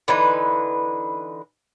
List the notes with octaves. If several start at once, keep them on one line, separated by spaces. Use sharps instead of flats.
D3 E3 D#4 B4